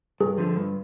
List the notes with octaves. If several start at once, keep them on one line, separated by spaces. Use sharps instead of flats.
G2 G#4
D3 F3
G2